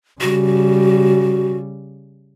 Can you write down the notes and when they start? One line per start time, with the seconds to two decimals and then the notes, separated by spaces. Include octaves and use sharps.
0.21 C#3 G3 F#4